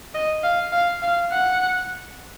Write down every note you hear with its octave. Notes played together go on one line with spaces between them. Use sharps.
D#5
F5
F5
F5
F#5